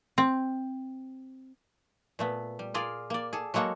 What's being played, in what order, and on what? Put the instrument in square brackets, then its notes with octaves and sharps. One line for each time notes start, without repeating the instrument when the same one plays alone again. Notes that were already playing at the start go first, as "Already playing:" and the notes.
[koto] C4
A#2 A3 B3
G3
F4 G#4 A#4 D5
A#3 D5
G#4 A4
F#3 G#3 A#3 F#4 A4